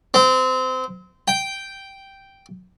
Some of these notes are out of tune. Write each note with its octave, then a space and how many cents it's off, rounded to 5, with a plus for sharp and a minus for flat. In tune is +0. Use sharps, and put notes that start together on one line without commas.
C4 -25
G5 -5